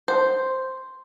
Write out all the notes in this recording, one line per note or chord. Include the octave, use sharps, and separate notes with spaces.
C5